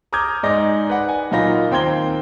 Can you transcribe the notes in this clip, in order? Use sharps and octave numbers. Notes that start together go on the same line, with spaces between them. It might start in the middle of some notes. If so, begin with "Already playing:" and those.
A#5 D6 D#6 F6 G6 G#6
G#2 G#3 D#4 D5 A#6
B4 F#5
G#5
A#2 F#3 D#4 F4 B5 A#6
D#2 C4 G5 C6 G#6 G7